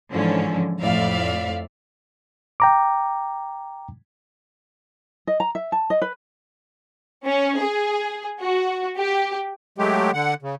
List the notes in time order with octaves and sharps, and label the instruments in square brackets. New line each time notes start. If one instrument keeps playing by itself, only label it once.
[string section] G#2 D3 E3 F3 C#4
F2 A2 D5 E5 F5
[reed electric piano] G5 A#5 D6
[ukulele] D#5
A#5
E5
A5
D#5
B4
[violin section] C#4
G#4
F#4
G4
[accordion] F#3 G#3 A3 G4
D3 F#5
C#3